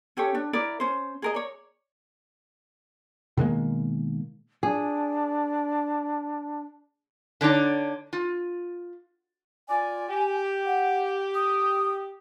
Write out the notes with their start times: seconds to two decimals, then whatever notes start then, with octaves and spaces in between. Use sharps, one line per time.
0.17 C#4 G4 A4 C#5
0.35 D4
0.53 E4 A#4 D5 A#5
0.80 C#4 C5
1.22 G#4 A#4 D#5
1.35 C#5 D5
3.37 B2 D#3 G#3 A#3
4.63 D4 G#4
7.41 D3 D4 D#4 C#5
8.13 F4
9.69 F4 D5 G#5
10.09 G4
10.66 F#5
11.35 D#6